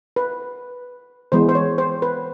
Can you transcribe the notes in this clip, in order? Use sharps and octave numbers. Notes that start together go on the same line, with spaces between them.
B4
E3 G#3 B3 C5
C5
C#5
C5
B4